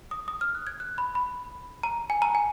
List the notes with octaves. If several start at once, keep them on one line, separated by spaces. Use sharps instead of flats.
D#6
D#6
F6
F#6
G#6
F#6
B5
B5
A#5
G#5
A#5
G#5